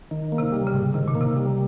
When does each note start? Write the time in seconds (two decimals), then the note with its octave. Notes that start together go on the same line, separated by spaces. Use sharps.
0.11 D#3
0.32 A#3
0.38 C3
0.52 G3
0.67 C#3
0.74 G#2
0.94 C3 D#3
1.08 A#2
1.15 A#3
1.21 C3
1.36 G3